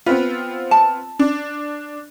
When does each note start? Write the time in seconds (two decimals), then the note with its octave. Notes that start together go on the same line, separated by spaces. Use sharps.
0.06 B3 C4 F4 B4
0.71 A5
1.19 D4